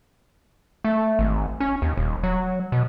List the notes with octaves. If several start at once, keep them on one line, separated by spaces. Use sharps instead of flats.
A3
G#1
C#4
D#2
D#1
F#3
B2